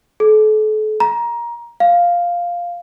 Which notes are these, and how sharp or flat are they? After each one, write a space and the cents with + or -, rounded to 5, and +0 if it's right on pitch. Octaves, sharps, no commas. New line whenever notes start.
A4 -40
A#5 +20
F5 +0